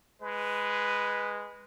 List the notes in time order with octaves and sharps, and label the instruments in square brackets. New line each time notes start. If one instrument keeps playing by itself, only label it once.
[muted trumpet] G#3 [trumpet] B4